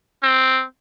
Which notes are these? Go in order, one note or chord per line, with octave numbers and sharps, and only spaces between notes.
C4